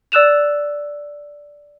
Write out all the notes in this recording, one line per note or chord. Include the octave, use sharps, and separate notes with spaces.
D5 E6 F#6 E7 F7